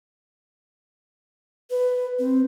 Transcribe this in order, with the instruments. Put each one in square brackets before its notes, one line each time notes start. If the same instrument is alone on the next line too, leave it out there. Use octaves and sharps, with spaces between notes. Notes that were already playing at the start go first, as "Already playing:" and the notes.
[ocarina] B4
C4